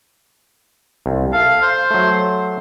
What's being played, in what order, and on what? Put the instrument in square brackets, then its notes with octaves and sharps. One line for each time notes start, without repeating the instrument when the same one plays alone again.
[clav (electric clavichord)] C2
[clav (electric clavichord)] A4 [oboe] F5
[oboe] C5
[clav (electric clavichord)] F#3 A3